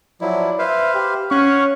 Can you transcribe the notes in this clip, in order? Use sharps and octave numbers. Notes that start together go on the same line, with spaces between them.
F3 F#3 E4 D5
B4 C5 E5 F5
G4
C#4 F5 F#5 C#6 F#6